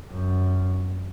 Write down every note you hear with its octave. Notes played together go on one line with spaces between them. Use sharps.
F#2